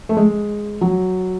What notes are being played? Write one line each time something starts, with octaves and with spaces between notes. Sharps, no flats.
A3
G#3
F#3